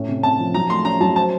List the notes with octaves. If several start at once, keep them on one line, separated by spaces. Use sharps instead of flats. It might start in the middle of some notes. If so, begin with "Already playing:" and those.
Already playing: A2 C#4
C3
C3 A5
F3
F#3 A#5
A3 C6
C#4 A#5
F#3 A5
C5 A5